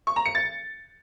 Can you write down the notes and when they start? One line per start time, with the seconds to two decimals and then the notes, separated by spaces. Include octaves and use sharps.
0.07 C#6
0.16 A#5
0.26 C#7
0.35 A6